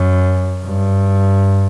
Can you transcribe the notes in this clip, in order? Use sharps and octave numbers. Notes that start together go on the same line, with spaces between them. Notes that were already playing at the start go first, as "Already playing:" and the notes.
Already playing: F#2
G2